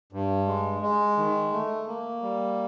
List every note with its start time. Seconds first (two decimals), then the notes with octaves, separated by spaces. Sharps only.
0.12 G2
0.47 G#3
0.82 G#3
1.18 D#3
1.52 A3
1.87 A#3
2.22 G3